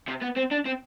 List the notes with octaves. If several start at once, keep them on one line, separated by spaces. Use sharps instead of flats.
C3
B3
C4
D4
C4